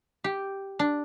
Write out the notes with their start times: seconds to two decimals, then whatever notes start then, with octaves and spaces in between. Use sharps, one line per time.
0.24 G4
0.79 D4